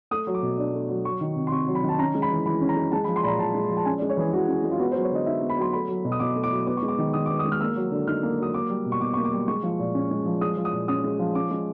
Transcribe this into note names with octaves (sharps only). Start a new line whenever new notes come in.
A3 D#6
F#3
D6
B2
D4
A3
F#3
F#3 C#6
D#3
C3
C6
C3 C#6
F#3
B5
D#3
A5
C#4 A#5
G#3
B5
E3
E3 B5
C#4
A#5
G#3
G#3 A5
B5
F3
C6
A#2 A#5 B5
A#2 A5
G#3
F3
A5
C#4 G#5
D5
G#3
C#5
E3 G#4
E3 F#4
C#4
G#3
F4
B3 F#4
C5
F#3
C#5
D3 D#5
D#4 E5
B3
B5
F#3 C6
A3 B5
F#3
B2
D#6
B2 D6
A3
D6
F#3
B3 D6
C#6
G#3
D6
D#3
D#3 D#6
B3 D6
D#6
G#3
F6
A#3 E6
F#3
D3
D#4 F6
A#3
F#3 D#6
A#3 D6
G3
B2
C#6
B2 D6
A#3 C#6
D6
G3
G#3 C#6
F3
A#2
C#4
G#3
F3
G#3 D#6
F3
D#6
A#2
C#4 D#6
G#3
F3
C#4 D6
G#3